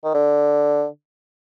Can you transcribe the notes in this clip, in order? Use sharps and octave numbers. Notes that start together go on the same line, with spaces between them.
D#3
D3